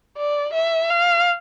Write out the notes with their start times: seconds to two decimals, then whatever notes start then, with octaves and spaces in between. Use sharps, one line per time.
0.17 D5
0.54 E5
0.90 F5